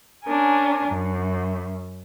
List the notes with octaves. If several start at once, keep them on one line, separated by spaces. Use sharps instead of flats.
C#4 D4 A#4 G#5
F#2